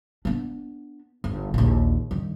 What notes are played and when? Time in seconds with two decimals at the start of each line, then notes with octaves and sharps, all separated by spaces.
0.25 B3 D4
1.24 G1
1.54 A#1 D#2
2.11 G2 D#3